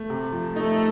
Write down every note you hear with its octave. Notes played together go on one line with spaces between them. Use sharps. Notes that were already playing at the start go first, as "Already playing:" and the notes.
Already playing: A3
C3
F3
A3 D#4